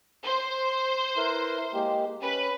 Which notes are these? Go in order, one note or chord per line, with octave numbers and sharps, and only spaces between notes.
C5
E4 A#4 B4
G#3 A#3 G4
C#4 B4